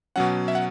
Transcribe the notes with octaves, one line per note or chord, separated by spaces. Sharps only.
B2 F#3 C#4 F#5
E5
F#5